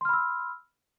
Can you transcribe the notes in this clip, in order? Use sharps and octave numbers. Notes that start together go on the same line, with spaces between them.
B5 C6 E6 F6